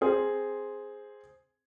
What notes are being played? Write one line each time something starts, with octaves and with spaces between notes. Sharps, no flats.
C4 G#4 C5